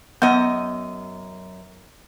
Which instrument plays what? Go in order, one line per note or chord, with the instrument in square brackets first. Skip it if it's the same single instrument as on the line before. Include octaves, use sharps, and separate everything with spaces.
[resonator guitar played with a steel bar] F#2 D#5 [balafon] B3